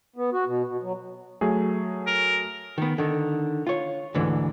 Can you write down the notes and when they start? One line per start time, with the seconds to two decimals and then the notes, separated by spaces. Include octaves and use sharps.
0.16 B3
0.33 F#4
0.47 B2
0.67 B2
0.82 F#3
1.41 F#3 A3 G#4
2.07 A#4
2.78 D#3 B3
2.98 D3 D#3
3.67 F4 C#5
4.14 D2 G#2 D3 E3